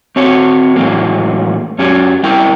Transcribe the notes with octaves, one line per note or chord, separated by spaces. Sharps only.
C4 F#4 C#5
A2 E3 F#3 G#3 A#3
F#2 C#4 F#4 G4 C#5
G3 E4 A#4 G5